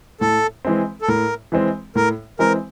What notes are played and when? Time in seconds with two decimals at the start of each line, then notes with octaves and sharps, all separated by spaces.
0.21 A2 A4
0.65 E3 G#3 C4
1.02 A4
1.08 A2 A#4
1.52 E3 G#3 C4
1.95 A2 A#4
2.39 E3 G#3 C4 A#4